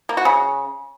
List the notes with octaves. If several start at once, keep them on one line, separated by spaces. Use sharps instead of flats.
A#3
F#4
C#3